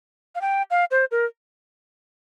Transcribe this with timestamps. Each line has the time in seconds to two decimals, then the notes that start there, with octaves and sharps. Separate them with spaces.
0.35 F5
0.41 G5
0.71 F5
0.91 C5
1.11 A#4